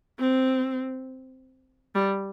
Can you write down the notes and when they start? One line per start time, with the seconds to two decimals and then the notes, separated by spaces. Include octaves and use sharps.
0.19 C4
1.95 G3